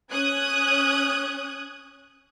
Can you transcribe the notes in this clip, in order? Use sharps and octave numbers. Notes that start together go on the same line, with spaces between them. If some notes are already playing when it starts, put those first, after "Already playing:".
C#4 D#6 F#6 G#6